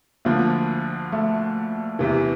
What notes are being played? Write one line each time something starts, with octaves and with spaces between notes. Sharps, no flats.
D2 D3 F3 A#3
A3
E2 C3 E3